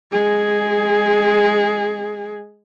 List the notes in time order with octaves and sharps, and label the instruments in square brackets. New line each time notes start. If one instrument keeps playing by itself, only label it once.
[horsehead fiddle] G#3 G#4